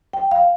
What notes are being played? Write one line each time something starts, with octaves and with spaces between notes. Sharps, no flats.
G5
F5